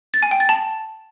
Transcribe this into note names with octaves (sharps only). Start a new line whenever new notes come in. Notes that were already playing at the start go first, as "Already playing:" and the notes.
A6
G#5
G5
A6
A5